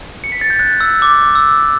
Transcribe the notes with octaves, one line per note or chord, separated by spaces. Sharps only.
C#7
B6
A6
G6
F#6
E6
D6
E6